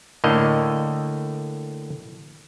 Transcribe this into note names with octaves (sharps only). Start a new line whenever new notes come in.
A2 D3 A#3 D#5